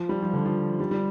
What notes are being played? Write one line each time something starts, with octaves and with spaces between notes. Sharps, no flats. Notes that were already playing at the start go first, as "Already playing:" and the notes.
Already playing: F3
G3
F3
D3
F3
G3
G3